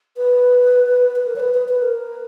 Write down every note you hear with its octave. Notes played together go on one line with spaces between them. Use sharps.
B4
B4
A#4
C#5
B4
B4
B4
A#4